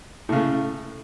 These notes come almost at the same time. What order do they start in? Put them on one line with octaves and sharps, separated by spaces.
A2 C#3 A3